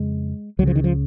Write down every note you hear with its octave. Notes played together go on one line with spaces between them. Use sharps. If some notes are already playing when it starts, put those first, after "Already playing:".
Already playing: F2 C#3 G#3
C#2 C#3 F3 F#3
D#3
F3